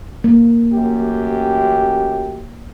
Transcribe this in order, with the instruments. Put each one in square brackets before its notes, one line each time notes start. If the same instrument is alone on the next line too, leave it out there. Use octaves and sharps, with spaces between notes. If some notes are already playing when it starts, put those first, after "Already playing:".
[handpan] A#3
[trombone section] A1 F#2 G4